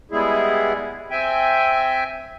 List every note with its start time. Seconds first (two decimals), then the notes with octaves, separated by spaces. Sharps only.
0.11 G3 G#3 B3 E4 G#4
1.11 C4 E5 G5 G#5